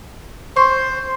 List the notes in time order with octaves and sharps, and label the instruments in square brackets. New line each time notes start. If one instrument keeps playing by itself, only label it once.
[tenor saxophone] C5 [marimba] C6 C#6